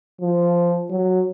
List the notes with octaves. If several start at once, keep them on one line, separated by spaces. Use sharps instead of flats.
F3
F#3